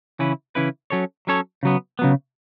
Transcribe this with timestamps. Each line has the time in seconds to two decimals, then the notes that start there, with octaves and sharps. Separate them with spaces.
0.19 C#3 E3 C#4 E4 B4
0.55 C#3 E3 C#4 E4 B4
0.90 F#3 C#4 A4 C#5
1.27 F#3 C#4 A4 C#5
1.63 C#3 F#3 B3
1.99 C#3 F#3 B3